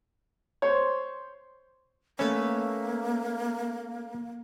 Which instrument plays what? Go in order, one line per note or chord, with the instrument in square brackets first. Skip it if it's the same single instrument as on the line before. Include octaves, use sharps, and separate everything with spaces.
[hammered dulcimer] C5 [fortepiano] C#5
[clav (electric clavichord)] A3 C#4 [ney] A#3 [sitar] B4 C#5 E5